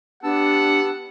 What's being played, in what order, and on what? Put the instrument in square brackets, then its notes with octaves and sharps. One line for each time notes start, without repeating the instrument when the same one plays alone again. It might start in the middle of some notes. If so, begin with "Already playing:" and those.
[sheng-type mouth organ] B3 A5 E6 [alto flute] D4 [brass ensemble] G4 [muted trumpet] F#5